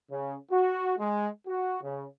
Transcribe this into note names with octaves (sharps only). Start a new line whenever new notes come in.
C#3
F#4
G#3
F#4
C#3